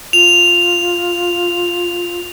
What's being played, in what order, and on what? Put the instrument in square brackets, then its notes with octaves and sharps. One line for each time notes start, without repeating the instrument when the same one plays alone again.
[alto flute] F4 [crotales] F7